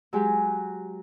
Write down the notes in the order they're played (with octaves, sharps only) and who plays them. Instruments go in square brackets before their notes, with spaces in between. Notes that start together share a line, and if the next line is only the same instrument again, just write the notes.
[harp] F#3 G#3 G4 G#4